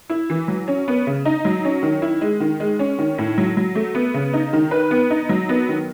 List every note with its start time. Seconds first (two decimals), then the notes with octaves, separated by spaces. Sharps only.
0.10 E4
0.30 E3
0.48 F#3
0.68 C#4
0.88 B3
1.07 C#3
1.25 D#4
1.45 F#3
1.65 C#4
1.83 D#3
2.02 E4
2.21 G#3
2.40 D#3
2.60 G#3
2.79 C#4
2.98 D#3
3.18 A2
3.38 F#3
3.57 F#3
3.75 A3
3.95 B3
4.14 C#3
4.33 D#4
4.53 D#3
4.71 B4
4.91 B3
5.10 D#4
5.29 F#3
5.49 B3
5.69 D#3